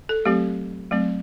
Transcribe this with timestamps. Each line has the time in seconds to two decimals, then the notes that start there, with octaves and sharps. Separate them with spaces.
0.09 A4
0.25 F#3 A3 C4 G4
0.91 F#3 A3 C4